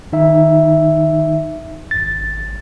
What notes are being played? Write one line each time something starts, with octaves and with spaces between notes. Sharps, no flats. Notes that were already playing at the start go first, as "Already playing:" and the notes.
D#3 D#4 E5
G#1 A6